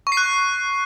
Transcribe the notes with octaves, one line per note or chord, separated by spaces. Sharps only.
C#6
C7
F#6